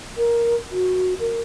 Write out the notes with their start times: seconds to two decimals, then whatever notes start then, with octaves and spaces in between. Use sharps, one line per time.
0.17 A#4
0.71 F#4
1.20 A#4